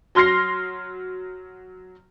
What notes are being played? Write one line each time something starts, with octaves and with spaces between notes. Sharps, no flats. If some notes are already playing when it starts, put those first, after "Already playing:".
F#3 C6 F6 A#6 C7